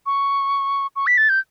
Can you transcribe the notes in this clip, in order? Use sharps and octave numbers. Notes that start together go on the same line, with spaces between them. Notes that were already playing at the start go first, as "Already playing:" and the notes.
C#6
C#6
B6
A6
G6